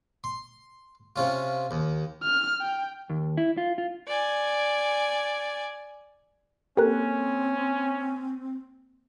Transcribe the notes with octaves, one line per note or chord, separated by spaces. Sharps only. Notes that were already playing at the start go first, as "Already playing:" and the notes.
C6
C3 C#4 F4
D#2
F6
G5
D#2
E4
F4
F4
D5 G#5
A#3 C4 C#4 G4 A4 A#4 F#6